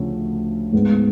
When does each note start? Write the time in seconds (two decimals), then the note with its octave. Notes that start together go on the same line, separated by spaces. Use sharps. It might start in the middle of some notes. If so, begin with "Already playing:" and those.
Already playing: D2 C#3 F3 A3 C#4
0.72 G#2 G#3 B3